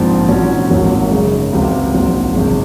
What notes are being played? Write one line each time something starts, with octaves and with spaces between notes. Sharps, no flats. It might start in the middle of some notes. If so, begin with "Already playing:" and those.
Already playing: A#1 G#2 F3 C4
G#2 F#3 C#4
G#1 G#2 F#3 A#3
F#2 C#3 G#3
C#2 C3 F#3 C4
A#1 G#2 F#3 C4
G#1 F#2 C#3 G#3